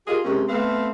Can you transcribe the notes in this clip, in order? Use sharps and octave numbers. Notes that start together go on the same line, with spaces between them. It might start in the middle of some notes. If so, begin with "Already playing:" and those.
F4 G4 G#4 A#4 D#5
C3 G#3 A#3 C4 C#4
A3 B3 C4 F5